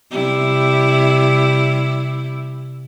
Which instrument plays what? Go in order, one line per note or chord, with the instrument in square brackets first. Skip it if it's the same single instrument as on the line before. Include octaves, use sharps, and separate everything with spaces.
[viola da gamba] C3 G3 E4